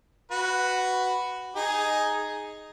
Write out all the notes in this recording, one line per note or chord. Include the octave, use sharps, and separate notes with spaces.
F#4 B4
D#4 G#4